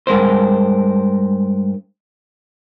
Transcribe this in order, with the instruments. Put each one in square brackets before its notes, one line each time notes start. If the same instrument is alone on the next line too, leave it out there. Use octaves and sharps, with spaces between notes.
[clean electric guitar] G2 G#3 A#4 C5